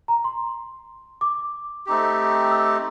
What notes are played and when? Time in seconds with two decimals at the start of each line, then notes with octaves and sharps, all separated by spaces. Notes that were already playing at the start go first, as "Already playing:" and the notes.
0.08 A#5
0.24 C6
1.21 D6
1.86 A3 C4 D#4 G4
2.51 E6